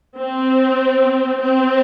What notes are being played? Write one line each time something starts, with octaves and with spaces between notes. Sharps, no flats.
C4
C4